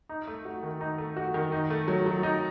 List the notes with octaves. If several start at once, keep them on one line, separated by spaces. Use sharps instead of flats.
D#4
A3
F#4
D#3
D#4
A3
F#4
D#3
D#4
A3
F#3
F#3
D#4